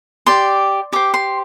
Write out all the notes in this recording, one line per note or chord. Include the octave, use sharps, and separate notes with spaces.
G4 D5 C6
G4 C5 D6
C6